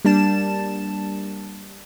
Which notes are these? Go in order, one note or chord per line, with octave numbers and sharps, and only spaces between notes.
G3 A#3 D4 A5 E7